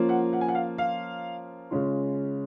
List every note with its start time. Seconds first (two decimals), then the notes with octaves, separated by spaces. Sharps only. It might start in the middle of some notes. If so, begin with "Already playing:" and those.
Already playing: F3 A#3 C#4 F4
0.09 F#5
0.33 F#5
0.41 G#5
0.48 F#5
0.55 F5
0.78 F5
1.71 C#3 G#3 C#4 F4